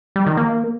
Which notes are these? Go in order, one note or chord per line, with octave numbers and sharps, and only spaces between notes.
G3
D#3
A#3